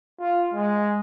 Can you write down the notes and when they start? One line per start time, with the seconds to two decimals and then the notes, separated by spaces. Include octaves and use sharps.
0.20 F4
0.54 G#3